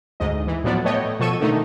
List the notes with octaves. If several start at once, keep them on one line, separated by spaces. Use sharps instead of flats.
D2 G#2 D#5
E3
A2 F3 F#3 B3 D5
A3 B3 C#5 D#5 G5
B2 F3 A4 C#6 E6 D#7
D3 D#3 A3 D#4